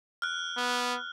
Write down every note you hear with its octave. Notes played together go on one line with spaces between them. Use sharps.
F6 F#6
B3